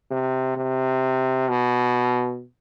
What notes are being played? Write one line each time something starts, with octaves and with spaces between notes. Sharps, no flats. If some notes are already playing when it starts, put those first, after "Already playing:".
C3
C3
B2